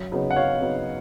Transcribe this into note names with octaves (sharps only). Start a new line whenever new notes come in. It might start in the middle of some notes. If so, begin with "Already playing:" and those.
Already playing: F#2
C#3 F#3 B3 D#4
F#5
F#2 C#5 F5
C#3 F#3 B3 D#4